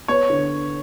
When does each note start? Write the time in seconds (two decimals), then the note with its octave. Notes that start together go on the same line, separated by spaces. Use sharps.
0.08 B3 C#5
0.30 D3